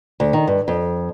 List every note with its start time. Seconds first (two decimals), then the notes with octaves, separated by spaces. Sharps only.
0.20 D2
0.33 D#3
0.47 G2
0.68 F2